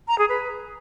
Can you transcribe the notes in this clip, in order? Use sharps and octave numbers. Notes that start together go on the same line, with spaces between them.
A#5
G#4
B4